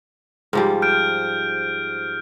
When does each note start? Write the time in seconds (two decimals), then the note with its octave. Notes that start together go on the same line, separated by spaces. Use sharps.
0.53 G#2 F3 G3
0.82 F6 G6 D7